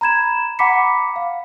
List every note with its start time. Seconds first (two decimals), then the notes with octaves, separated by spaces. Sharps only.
0.01 A#5 B5 G#6 E7
0.59 F#5 A#5 B5 D6 B6 C#7
1.16 F5